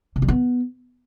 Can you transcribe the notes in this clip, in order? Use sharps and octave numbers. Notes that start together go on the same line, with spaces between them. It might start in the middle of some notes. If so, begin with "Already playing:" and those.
C3
G3
B3